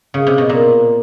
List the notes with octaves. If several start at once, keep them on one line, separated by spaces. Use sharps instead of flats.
C#3
C3
B2
A#2